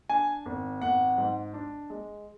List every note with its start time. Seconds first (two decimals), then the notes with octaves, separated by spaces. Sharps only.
0.09 D4 G#5
0.46 G#1
0.82 G#1 F#5
1.18 G#2
1.54 D4
1.90 G#3